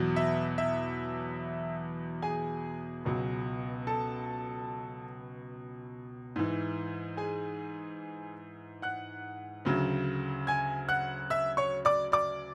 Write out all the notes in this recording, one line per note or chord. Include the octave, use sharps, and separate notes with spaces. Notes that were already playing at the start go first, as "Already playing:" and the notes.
Already playing: E2 B2 F#3
E5
E5
G#4 G#5
C#2 B2 F#3
A4 A5
G#2 E3
G#4 G#5
F#5 F#6
D2 C#3 F#3
G#5 G#6
F#5 F#6
E5 E6
C#5 C#6
D5 D6
D5 D6